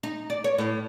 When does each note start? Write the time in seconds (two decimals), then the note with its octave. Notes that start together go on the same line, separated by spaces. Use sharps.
0.03 D#4
0.30 D5
0.44 C#5
0.58 A2